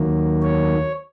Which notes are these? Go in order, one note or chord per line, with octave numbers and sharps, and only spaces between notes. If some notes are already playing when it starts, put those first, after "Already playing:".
Already playing: D#2 D#3 F#3 A#3
C#5